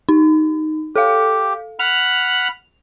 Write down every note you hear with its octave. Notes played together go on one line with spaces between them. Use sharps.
D#4
G4 A4 F5
F#5 B5 F6 F7